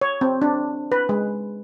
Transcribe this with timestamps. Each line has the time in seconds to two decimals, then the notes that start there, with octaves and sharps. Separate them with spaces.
0.01 C#5
0.21 C4
0.42 D4
0.92 B4
1.09 G#3